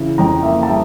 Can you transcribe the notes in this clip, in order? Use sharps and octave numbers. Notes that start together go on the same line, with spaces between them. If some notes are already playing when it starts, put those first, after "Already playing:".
Already playing: C#3 E3
F2 G5 A#5
A#3 E5
A5
G3 E5 G5